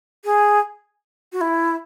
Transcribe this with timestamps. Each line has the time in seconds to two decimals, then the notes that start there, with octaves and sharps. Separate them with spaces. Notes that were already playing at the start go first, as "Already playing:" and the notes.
0.25 G#4
1.33 F#4
1.41 E4